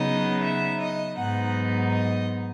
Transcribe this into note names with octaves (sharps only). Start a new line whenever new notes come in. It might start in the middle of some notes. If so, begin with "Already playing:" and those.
Already playing: C#3 F#3 B3 D#4 D#5
E5
D#5
G#2 F#3 B3 D#4 F#5
D#5